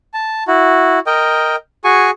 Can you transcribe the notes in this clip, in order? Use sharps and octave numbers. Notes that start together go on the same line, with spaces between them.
A5
E4 F#4
A#4 D#5 G5
F#4 G#4 G#5 C#6